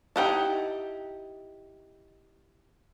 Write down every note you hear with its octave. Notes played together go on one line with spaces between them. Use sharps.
D#4 E4 G4 F#5 A5